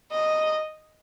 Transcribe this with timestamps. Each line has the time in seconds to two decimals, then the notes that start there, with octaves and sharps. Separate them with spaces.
0.11 D#5